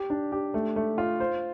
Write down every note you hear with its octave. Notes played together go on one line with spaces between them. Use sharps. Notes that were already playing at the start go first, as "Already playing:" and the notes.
Already playing: G4
D4
G4
A3
A3
F4
C5